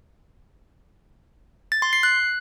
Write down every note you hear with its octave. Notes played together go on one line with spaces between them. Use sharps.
A6
C6
C7
F#6